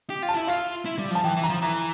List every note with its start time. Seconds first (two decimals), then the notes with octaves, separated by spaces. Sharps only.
0.10 G4
0.23 F4
0.29 A5
0.35 E4
0.47 F4 F5
0.85 E4
0.98 G3
1.11 F3
1.15 A5
1.24 E3 G5
1.36 E3
1.43 A#5
1.49 F3
1.62 E3 A#5